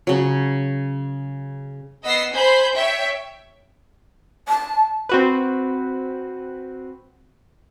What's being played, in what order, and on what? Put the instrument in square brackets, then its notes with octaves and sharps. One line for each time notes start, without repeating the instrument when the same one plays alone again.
[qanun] C#3 F#3
[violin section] B3 D#5 E6 A#6 C7
C5 G#5 B5 G6
C#5 E5 G5
[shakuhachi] A5
[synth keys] C4 F#4 B4